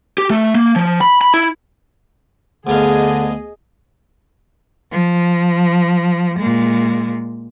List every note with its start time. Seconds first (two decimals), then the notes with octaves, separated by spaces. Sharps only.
0.18 G4
0.30 A3
0.55 A#3
0.76 F3
1.01 B5
1.21 B5
1.34 E4
2.67 D2 D3 B3 G#4 D#5 F5
4.92 F3
6.39 A#2 G#3